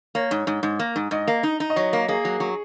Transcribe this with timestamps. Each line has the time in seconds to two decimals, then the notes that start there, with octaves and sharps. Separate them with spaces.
0.15 A#3 C#5
0.31 G#2
0.47 G#2
0.63 G#2
0.79 A#3
0.96 G#2
1.11 G#2 D#5
1.28 A#3
1.43 D#4
1.60 D#4
1.70 D#5
1.76 F#3 C#5
1.93 A#3
2.08 A#3 G#4
2.25 F#3
2.40 F#3